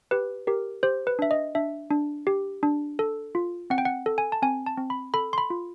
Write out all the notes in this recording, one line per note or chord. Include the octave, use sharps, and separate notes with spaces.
G4 B4
G4 A#4
G4 C5
B4
D4 E5
D#5
D4 E5
D4
G4
D4
A4
F4
C4 F#5
G5
F#5
A4
G#5
A5
C4 G#5
A5
C4
B5
A4 B5
C6
B5
F4